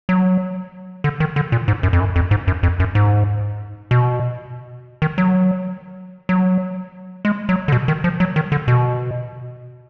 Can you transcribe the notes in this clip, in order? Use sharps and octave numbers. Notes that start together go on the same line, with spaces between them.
F#3
D3
D#3
D3
A#2
G#2
F#2
F2
F#2
F2
G#2
F#2
F2
F#2
G#2
B2
D#3
F#3
F#3
G#3
F#3
D3
B2
D#3
F3
F#3
D#3
D3
B2